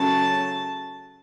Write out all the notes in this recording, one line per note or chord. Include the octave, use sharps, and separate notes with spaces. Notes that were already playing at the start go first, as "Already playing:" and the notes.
Already playing: C#3 F#3 A3 A5